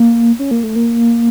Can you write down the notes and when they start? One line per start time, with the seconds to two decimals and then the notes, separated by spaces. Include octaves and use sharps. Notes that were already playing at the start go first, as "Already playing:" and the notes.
Already playing: A#3
0.39 C#4
0.51 A#3
0.63 A3
0.76 A#3